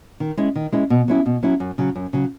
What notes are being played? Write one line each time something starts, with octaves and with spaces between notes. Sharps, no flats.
D#3
G#3 C#4 E4
D#3
G#3 C#4 E4
B2
F#3 C#4 E4
B2
F#3 C#4 E4
F#2
C#3 F#3
F#2
C#3 F#3